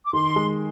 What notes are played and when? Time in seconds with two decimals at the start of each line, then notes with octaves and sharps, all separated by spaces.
0.06 D6
0.13 D#3 C6
0.36 G#3